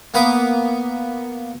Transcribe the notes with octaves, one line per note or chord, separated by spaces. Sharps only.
A#3 B3 F#5 B5 D6 D#6